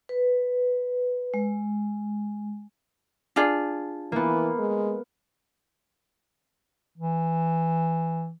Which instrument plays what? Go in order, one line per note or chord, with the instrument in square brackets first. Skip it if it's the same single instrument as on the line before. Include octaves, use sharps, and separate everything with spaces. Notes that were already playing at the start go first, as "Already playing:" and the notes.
[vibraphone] B4
G#3
[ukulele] D4 F4 G#4
[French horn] E3 [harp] A#3 B3
[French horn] G#3
[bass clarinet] E3